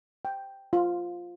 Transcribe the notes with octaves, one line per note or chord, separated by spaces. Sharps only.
G5
F4